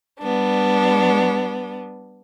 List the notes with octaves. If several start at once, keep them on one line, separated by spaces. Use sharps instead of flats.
G3 B3 D4